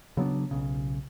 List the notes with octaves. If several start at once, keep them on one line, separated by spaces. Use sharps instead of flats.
C#3 F#3 B3 D4
B1 C#3